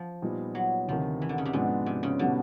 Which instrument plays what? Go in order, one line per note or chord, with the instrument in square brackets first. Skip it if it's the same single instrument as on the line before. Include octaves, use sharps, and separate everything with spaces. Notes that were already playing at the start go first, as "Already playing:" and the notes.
Already playing: [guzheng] F3
[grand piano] A#2 G3 B3 D#4
[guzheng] F#3
[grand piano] D2 C3 D#3 [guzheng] F3
[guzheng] E3
D3
C#3
C3
[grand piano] G#2 F3 G#3 B3 D4 [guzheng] B2
[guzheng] C3
C#3
[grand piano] B2 G3 B3 D#4 F#4 [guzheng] D3